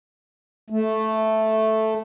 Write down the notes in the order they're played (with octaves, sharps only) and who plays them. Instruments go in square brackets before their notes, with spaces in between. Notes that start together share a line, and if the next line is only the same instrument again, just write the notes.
[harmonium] A3